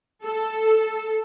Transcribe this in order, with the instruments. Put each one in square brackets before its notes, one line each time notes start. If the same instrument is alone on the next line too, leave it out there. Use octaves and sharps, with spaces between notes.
[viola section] A4